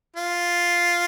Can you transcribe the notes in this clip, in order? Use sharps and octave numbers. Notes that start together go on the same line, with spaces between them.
F4